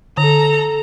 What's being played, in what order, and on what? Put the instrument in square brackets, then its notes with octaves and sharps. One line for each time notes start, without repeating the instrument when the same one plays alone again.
[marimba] D3 [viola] A4 A#5